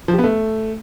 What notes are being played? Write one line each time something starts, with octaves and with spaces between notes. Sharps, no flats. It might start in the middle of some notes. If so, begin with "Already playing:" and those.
F3
G4
B3
A3